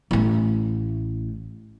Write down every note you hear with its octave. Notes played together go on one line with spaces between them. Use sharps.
A1 A3